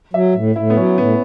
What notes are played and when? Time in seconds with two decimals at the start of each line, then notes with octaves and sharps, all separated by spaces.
0.13 F#3 E5
0.35 A2
0.56 A2 E4
0.70 B3
0.76 F#3 C#4
0.98 A2 B3